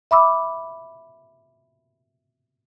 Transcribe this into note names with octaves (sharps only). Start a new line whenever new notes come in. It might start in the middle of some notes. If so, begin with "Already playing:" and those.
E5 B5 D6 E6